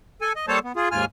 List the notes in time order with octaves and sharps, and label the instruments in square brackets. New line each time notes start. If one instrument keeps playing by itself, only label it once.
[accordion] A4 G#5
D#5
G3 A#3 A4 C5 C#5 A5
B3
F4 G#4
D#2 G#2 F4 G#5 F6